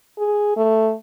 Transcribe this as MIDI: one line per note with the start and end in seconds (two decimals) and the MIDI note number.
0.18 0.54 68
0.56 0.93 57